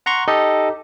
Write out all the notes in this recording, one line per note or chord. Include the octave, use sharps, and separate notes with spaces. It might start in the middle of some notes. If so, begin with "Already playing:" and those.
F#5 A#5 C6 C#6
D#4 G4 A4 D#5